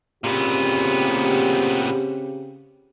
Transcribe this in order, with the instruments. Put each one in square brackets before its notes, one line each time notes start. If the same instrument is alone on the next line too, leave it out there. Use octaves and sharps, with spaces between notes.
[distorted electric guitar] A#2 B3 [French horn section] C#3 C4 G4